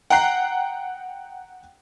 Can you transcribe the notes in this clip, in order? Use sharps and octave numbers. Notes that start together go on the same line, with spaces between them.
F#5 G5 A#5 F#6 C7